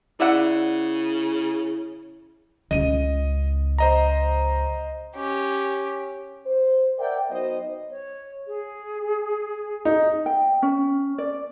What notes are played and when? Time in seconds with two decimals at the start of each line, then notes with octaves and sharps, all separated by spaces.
0.20 C#3 E4 D5 E5 F#5
2.71 C#2 C#3 D#5 D#7
3.79 C5 D#5 A#5
5.16 C#4 G4
6.46 C5
6.99 A#4 D5 E5 F#5 G5
7.30 F#3 B3 D#4 C5 D#5
7.90 C#5
8.47 G#4
9.85 D#4
10.26 G5
10.62 C#4
11.18 D5